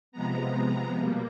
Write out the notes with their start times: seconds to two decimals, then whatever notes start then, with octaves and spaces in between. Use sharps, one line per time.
0.12 C3 F3 G#3 B3 A#5
0.97 B2 G3 A#3